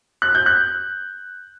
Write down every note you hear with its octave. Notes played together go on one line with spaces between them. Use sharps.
F#6
G6
F#6